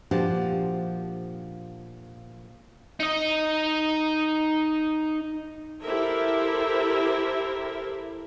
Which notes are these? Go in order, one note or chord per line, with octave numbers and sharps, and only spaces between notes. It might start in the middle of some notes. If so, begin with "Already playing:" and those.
A#2 F3 D4 F#4 G4 C5
D#4 D#5
E4 G4 A4 A#4 C5 E5